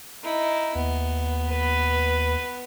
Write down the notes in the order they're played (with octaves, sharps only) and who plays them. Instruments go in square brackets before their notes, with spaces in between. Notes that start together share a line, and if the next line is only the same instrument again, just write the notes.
[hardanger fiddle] D#4 E4
[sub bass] D#2 [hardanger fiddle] B3
[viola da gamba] B4